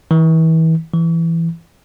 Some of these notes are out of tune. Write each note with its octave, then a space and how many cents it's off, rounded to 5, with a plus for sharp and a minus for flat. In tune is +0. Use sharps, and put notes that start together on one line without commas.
E3 -35
E3 +10